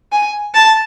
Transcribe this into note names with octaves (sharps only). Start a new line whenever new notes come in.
G#5
A5